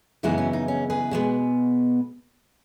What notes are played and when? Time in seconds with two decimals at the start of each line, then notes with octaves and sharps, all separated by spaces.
0.23 F#2 C#3 E3 G#3 B3 D#4 F#4
0.38 C#4
0.53 D#4
0.68 C#4
0.90 G#4 B4
1.11 B2 G#3 B3